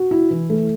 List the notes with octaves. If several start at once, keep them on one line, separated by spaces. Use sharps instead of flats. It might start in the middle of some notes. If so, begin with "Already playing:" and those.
Already playing: F#4
E4
E3
A3